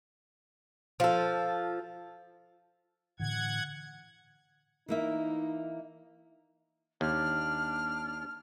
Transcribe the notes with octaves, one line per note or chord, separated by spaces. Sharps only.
F3 A4
A2 D3 E3 F#5 G#6
E3 A#3 D#4 E5
D#2 D4 F6